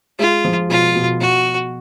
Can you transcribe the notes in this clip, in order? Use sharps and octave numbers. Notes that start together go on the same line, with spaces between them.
G#3 F4
F3
B2 F4
B2
B2 F#4